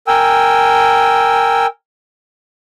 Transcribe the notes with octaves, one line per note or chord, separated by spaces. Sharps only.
A#4 G5 G#5 E6